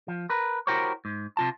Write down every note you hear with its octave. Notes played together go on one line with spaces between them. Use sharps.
F3
A#4 B4
E4 F#4 G4 A#4 C5 C#5
G#2
C3 F4 A5